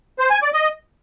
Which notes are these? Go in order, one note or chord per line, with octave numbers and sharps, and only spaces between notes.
C5
G#5
D5
D#5